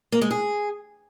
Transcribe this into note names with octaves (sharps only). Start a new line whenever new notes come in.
A#3
G#3
G#4